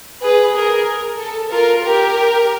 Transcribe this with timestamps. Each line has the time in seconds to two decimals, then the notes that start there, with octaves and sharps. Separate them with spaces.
0.23 G#4 B4
0.55 G#4 A#4
1.20 A4
1.52 F4 A#4
1.85 G4 A#4